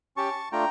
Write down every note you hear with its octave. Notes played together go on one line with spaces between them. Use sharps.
C#4 G4 A5 C#6
A3 D4 F4 G5 A#5